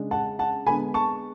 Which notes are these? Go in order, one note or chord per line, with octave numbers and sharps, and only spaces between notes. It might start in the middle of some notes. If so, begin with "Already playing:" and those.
Already playing: C#3 G#3 D4
F#5 A5
F#5 A5
D3 G#3 B3 G#5 B5
A5 C#6